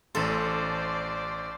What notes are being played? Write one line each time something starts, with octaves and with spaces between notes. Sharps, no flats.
A1 A4 C5 D5 C6